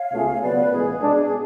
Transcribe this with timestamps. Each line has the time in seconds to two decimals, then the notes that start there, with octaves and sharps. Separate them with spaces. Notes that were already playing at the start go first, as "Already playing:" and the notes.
Already playing: C#5 F5
0.12 C#2 B2 A3 F4 G#4
0.41 C#3 F#3 B3 B4 D5
0.56 B4
0.71 A1 A2 G#3 G#4
1.01 B2 G#3 D4